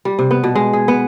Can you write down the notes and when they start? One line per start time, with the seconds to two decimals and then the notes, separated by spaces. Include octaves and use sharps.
0.05 G3
0.19 C3
0.31 B3
0.44 B2
0.55 G#3
0.73 G#4
0.88 B3